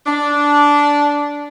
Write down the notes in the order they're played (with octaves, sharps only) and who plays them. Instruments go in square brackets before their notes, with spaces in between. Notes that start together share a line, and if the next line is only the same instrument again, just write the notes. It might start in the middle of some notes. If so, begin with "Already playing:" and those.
[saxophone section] D4